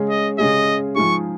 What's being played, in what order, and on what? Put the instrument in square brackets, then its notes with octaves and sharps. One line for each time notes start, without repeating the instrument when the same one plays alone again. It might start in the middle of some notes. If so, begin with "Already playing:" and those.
Already playing: [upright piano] C#3 G#3 C#4 G#4
[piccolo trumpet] D#5
[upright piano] C#3 G#3 C#4 G#4 [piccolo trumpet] D#5
[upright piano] F3 G#3 D#4 G#4 [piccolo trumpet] C#6